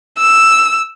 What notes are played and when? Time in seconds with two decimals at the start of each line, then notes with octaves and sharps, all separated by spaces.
0.18 E6